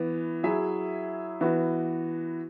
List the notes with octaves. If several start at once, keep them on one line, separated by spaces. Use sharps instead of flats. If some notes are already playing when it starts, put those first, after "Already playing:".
Already playing: E3 B3
F#3 E4 G#4 E5
E3 B3 F#4